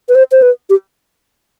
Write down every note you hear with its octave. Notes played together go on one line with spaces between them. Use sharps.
B4
C5
C5
B4
G4